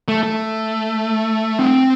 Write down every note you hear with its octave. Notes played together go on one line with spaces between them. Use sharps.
A3
A3
C4